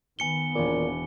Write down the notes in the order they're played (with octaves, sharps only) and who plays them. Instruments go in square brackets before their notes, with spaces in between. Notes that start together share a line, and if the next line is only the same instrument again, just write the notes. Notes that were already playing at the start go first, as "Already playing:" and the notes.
[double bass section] D#3 B3 [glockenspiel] G#5 C#7 G7
[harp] E1 C#5 D6 [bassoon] A#2